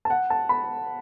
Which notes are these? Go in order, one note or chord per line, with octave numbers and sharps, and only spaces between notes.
A5
F#5
A5
B5